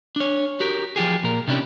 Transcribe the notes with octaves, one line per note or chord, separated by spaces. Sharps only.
D4 C#5
F#4 G4 A#4
F3 F4 G4 G#4
A#2 A#4
C3 C#4 D4 E4 G4